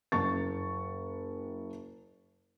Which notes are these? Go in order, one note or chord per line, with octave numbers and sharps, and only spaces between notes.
F#1 C#6 A6